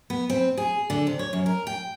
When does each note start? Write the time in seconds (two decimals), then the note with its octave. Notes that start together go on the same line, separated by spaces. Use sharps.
0.10 B3
0.30 C4
0.58 G#4
0.90 D3
1.07 C3
1.19 C#5
1.33 F#2
1.46 A#4
1.67 G5